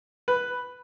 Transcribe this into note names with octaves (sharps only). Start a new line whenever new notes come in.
B4